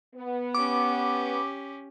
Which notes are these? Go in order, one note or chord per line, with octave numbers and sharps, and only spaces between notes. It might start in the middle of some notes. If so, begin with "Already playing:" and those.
B3
C#4 G4 D6